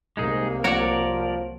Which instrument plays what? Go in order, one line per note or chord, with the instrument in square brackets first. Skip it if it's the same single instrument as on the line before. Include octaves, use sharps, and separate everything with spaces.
[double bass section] C2 A#3 [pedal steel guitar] G#3 D#4 G#4
[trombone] F3 [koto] F#4 C#5 [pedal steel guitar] A#4 D5